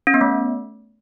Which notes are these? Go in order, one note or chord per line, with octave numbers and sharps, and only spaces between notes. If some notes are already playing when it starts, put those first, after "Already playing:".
C#4
B3
A3